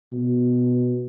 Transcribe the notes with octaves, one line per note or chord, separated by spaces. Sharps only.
B2